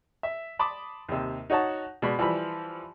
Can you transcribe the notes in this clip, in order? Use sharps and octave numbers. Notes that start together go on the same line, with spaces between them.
E5
A5 B5 C6 D6 D#6
D#2 C3
D#4 F#4 C#5 F#5 A5
B2 G#3 D5 B5
E3 F3 G3 B5